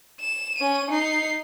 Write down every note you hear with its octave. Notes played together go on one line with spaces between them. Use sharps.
E7
C#4 D#7
D#4 C7